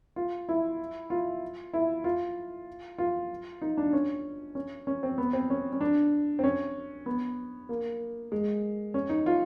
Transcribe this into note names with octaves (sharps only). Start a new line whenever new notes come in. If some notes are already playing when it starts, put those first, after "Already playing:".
F4
E4
F4
E4
F4
F4
D#4
D4
C#4
C#4
C#4
C4
B3
C4
C#4
C#4
D4
C4
C#4
B3
A#3
G#3
C#4
D#4
F4